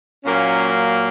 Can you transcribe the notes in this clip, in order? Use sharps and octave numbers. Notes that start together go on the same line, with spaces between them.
A#2 F#3 A#3 C#4